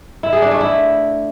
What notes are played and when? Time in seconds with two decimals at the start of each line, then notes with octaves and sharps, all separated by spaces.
0.23 E4
0.33 G#4
0.42 D4
0.51 A3
0.61 E4